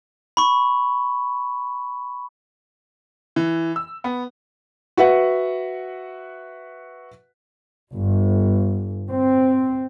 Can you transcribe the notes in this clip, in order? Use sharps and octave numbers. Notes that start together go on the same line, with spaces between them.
B5 C#6
E3
E6
B3
F#4 B4 E5 F#5
G1
C4